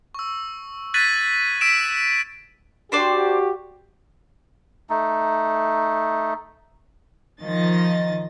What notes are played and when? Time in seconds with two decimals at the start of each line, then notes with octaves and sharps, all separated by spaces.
0.15 C#6 E6
0.94 F#6 G#6 A6 B6 D#7 F#7
1.61 E6 B6 D7 E7
2.92 D4 F#4 G4 C5 D5
4.90 A3 D#4
7.41 D#3 F3 D#5 A6